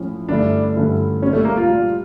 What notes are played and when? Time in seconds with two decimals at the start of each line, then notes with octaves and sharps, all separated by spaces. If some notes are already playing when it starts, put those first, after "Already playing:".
Already playing: A2 F3 C#4 E4
0.29 G2 D3 A3 C#4 D4 E4
0.76 G2 D3 A3 C#4 E4
1.22 A#2 G3 C#4 D4
1.33 A3
1.45 A#3
1.57 F4
1.68 A#2 G3 D4